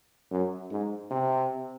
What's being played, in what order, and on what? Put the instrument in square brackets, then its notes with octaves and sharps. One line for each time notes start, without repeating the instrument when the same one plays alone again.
[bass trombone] F#2
G#2
C3